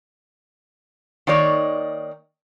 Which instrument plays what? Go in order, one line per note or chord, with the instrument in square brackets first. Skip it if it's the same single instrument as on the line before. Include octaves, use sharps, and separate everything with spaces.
[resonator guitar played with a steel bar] D#3 A#3 D#4 C#5 D5